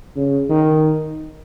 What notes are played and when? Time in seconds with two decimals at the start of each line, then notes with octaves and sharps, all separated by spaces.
0.17 C#3
0.49 D#3